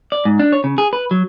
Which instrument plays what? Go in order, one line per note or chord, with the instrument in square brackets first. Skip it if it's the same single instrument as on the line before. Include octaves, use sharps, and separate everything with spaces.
[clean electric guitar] D5
G#2
D4
C#5
C#3
G#4
B4
F#3